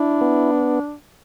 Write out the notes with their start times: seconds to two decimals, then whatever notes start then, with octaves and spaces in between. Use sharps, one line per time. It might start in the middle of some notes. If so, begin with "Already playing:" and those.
Already playing: D4 E4
0.21 B3